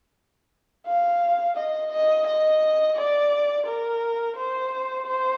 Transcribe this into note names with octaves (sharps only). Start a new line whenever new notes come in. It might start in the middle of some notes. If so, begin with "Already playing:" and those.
F5
D#5
D#5
D#5
D5
A#4
C5
C5